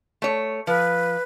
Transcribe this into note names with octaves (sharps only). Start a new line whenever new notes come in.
A3 C#5
F3 B4